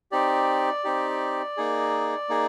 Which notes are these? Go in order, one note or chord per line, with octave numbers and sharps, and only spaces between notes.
C4 D#4 G4 D5
C4 D#4 G4
A#3 D#4 G#4
A#3 D#4 G#4